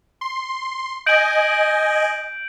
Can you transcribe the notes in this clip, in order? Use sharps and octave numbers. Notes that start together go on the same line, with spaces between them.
C6
D#5 G#5 G6 D7 F#7